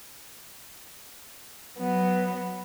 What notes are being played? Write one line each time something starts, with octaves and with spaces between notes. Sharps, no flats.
F#3 B3